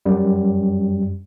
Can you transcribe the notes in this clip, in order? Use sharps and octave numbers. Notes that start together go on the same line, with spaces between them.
F#2 G3